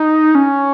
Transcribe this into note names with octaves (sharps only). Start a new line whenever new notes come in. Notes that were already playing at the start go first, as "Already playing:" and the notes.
Already playing: D#4
C#4